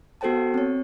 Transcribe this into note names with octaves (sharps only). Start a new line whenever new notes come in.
B3 F#4 A4 C5 G5 A5
C4 C#5